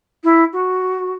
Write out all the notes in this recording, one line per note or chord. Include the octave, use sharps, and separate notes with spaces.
E4
F#4